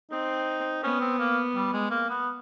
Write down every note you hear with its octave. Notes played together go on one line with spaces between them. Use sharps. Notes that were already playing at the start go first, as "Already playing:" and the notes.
C4 D#4
B3 C#4
C4
A#3
G3
G#3
A#3
B3